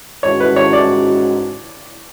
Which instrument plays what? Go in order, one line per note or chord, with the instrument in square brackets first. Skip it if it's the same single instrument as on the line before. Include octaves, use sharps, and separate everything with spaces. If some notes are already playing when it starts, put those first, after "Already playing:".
[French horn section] G#2 G#3 C#4 F#4 [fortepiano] C#5
[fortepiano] B4
C#5
D5